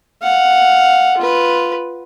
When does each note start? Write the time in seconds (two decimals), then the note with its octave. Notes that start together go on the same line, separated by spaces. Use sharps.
0.23 F5 F#5
1.17 F4 B4